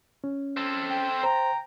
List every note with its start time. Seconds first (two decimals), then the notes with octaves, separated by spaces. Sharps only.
0.24 C#4
0.57 C4 A4
0.90 G5
1.23 C5 A#5